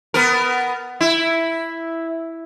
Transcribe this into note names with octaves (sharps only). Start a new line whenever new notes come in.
B3 A#4
E4